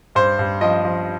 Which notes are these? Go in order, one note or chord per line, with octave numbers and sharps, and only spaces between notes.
G2 C5
G2
F3 D#5
F3